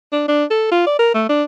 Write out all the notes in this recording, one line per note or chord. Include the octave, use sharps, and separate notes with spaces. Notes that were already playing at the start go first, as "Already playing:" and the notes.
D4
D4
A4
F4
D5
A#4
A3
D4